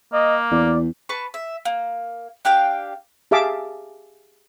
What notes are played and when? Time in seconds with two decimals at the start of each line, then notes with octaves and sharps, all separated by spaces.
0.13 A#3 D#5
0.52 E2 D5
1.09 B4 A5 C#6
1.34 E5
1.65 A#3
2.45 D4 G4 F5 G5
3.31 G4 G#4 E5 F5 A5 D6